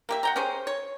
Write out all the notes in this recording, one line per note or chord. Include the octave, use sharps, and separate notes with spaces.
A#3 G4 E5
F#5 G5 A#5
C#4 G4 G#4 C5
C#5